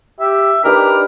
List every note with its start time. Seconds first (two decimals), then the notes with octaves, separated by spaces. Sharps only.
0.20 G4 E5
0.65 D4 D#4 G4 A#4 B4